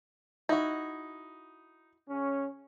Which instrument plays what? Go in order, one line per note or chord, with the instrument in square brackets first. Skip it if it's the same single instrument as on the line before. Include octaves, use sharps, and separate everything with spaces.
[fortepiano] D#4 [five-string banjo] E4 F#4
[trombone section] C#3 C#4